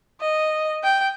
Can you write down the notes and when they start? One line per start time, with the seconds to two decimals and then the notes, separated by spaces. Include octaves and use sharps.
0.21 D#5
0.84 G5